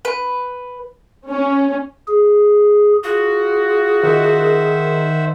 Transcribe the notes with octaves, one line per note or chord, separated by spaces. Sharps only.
B4
C#4
G#4
F4 F#4 G#4
D#3 C5 E5 F#5